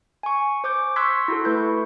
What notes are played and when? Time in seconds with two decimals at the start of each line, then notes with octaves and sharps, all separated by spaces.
0.23 G#5 C#6
0.64 C5 D6 G6
0.96 C6 C#6 E6 F#6 G#6 B6
1.28 E4 F#4 A4
1.45 A3 B4 G6
1.57 C#6